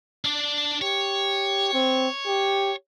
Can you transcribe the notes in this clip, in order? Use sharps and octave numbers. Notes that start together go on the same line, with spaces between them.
D4 D5
G4 C#5
C4
G4